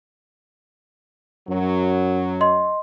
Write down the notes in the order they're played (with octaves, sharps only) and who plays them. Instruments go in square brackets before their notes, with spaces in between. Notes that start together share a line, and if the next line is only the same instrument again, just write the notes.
[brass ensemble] F#2 F#3
[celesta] D#5 C6